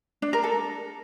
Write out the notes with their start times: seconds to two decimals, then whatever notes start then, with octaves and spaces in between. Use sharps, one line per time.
0.22 D4
0.33 A#4
0.44 A4